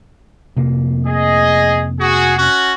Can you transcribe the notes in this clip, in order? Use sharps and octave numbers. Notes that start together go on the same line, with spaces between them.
F1 C3 A#3
G#4 D#5
F#4 G#4
C#4 F#4